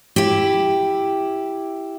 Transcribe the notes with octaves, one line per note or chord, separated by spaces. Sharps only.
E4 G4